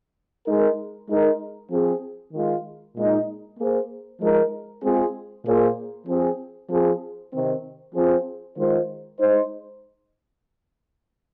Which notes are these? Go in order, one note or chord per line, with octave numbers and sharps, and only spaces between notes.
G#3 D#4 A#4
G#3 D#4 A#4
F3 C4 G#4
D#3 G#3 F4
A#2 G#3 D#4
A#3 G#4 C5
F3 G#3 D#4 A#4
G#3 C4 F4 G#4
A#2 A#3 G#4 C5
F3 C4 G#4
F3 C4 G#4
C3 D#3 C4
F3 C4 F4 G#4 C5
D#3 G#3 F4 C5
G#3 D#4 C5